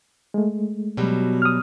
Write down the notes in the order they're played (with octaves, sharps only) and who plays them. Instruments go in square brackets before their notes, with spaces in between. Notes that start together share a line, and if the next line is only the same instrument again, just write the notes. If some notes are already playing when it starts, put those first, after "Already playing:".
[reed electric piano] G#3 A3
[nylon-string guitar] B2 F#3 G3
[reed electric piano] D#6 F6